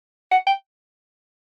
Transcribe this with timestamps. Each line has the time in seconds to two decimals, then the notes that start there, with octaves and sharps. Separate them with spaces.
0.32 F#5
0.47 G5